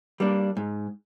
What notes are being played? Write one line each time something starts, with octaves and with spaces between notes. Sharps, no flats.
G3 A#3 D4
G#2